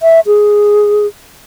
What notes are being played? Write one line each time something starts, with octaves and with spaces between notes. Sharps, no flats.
E5
G#4